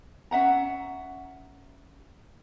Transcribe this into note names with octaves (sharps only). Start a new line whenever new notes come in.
C#4 E5 F#5 A#5